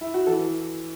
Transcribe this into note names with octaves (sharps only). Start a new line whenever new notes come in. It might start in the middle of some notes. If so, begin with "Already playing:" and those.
E4
F#4
E3 A4